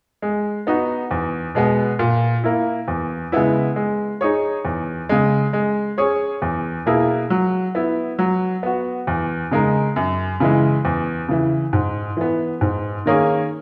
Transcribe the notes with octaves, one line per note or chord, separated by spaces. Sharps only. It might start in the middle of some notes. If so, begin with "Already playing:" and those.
G#3
B3 D#4 F#4
E2
B2 G#3 B3
A#2
A#3 E4
E2
C#3 G#3 B3 E4
G#3
D#4 G#4 C#5
E2
C#3 G#3
G#3
C#4 G#4 C#5
E2
B2 A#3 E4 G#4
F#3
B3 E4
F#3
B3 F#4
E2
C#3 G#3 D#4 A#4
F#2
C#3 E3 G#3
E2
C#3 E3
G#2
E3 B3
G#2
D#3 A#3 C#4 G#4